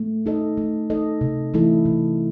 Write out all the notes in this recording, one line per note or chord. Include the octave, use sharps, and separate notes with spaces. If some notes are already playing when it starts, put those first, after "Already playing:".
Already playing: A3
D#4 A4 D#5
A3
D#4 A4 D#5
C3
E3 A3 E4 A4
C3